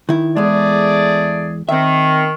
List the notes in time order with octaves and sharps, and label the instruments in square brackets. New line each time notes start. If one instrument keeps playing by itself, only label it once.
[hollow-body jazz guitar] D#3 E4
[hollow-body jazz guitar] E2 G#3 [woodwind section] A3 G#4 D5
[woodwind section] D#3 [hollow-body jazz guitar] C4 E5